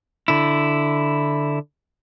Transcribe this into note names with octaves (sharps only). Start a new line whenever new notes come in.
D3 E4